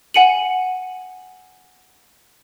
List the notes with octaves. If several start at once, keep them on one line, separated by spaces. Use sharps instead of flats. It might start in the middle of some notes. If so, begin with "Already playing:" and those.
F#5 G#5 C#7 D#7 F#7